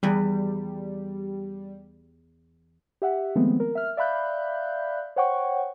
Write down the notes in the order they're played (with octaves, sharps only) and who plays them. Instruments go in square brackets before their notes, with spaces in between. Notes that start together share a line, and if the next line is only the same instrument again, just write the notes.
[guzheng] E2 B4 [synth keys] G3
[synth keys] G4 E5 F#5
D#3 F3 G#3 A3 B3 C4
A#4
E5 F6
D5 E5 F5 B5 F#6 G6
C5 C#5 F#5 G5 C#6